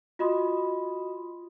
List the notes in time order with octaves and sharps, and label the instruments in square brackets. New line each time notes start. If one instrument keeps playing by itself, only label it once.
[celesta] F4 F#4 D#5 B5 C6 D#6